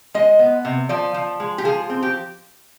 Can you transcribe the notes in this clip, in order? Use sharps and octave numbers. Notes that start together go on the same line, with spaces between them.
G#3 D#5
B3
C3
F3 D5
F3
G#3
G4
F3 G#4
C4
G4